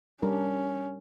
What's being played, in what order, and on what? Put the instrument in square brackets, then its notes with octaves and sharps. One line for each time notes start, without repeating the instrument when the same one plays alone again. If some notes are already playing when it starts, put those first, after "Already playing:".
[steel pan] G3 D4 A#4 [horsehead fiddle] C#4